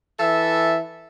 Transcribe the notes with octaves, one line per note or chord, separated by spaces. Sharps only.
E3 A4 E5